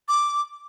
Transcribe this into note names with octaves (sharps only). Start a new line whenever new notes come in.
D6